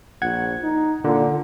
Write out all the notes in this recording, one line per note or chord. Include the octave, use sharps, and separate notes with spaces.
A#1 F#5 G#6
D#4
A#2 D3